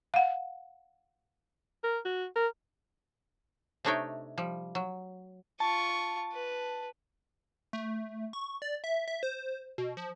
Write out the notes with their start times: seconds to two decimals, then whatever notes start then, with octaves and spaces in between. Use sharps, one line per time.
0.14 F5 F#5
1.84 A#4
2.05 F#4
2.36 A#4
3.85 C3 A3 D4 D#4 C#5 G5
4.38 F3 G3
4.75 F#3
5.60 F4 A5 C#6
6.33 B4
7.73 A3
8.33 C#6
8.62 D5
8.84 E5
9.08 E5
9.23 C5
9.78 B2
9.97 F3